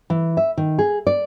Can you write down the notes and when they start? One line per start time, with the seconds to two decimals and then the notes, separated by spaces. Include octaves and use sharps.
0.10 E3
0.37 E5
0.57 D#3
0.79 G#4
1.07 D5